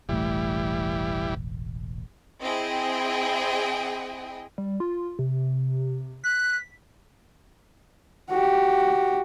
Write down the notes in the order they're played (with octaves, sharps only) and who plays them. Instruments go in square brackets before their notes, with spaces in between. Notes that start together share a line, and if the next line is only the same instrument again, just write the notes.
[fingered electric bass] E1 A1 A3 [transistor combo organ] E3 G3
[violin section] C4 E4 G#4 D#5 G5
[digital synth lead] G3
F4
C3
[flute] F#6 [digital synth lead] B6
[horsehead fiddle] F#4 G4